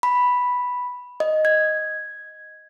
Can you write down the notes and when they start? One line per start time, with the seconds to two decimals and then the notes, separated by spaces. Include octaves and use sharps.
0.03 B5
1.20 D#5
1.45 G#6